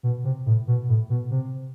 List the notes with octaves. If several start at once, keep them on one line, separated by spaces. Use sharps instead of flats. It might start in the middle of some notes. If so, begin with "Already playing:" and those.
B2
C3
A2
B2
A2
B2
C3